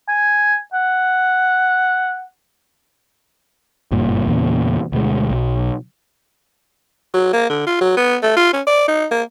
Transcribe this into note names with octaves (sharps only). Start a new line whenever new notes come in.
G#5
F#5
F#1 G2 A#2
E2 A#2 C#3
D2 B2 G#3
B1
F#3
A#3
D3
F4
F#3
B3
A3
F4
C#4
D5
D#4
A#3